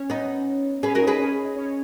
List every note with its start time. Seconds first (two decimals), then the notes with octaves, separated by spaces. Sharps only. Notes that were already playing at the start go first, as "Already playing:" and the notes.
Already playing: C#4 C#5
0.10 B3 D#4
0.83 C#4 G#4 B4 C#5
0.95 F#4 A#4
1.01 D#4 D#5
1.07 G#4 B4
1.19 C#4 C#5
1.45 D#5
1.56 C#4 C#5